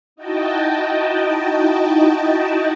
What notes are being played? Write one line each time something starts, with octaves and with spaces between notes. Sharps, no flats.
D#4 E4 F#4 D#5 G5 A5